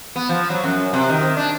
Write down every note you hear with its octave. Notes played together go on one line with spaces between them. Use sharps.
B3
F3
F#3
F#2
C3
D#3
D4